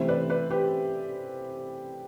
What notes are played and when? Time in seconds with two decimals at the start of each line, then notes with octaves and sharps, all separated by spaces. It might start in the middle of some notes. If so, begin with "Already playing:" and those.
Already playing: C3 E3 A3 C4 C5 E5
0.08 B4 D5
0.30 B4 D5
0.50 G4 B4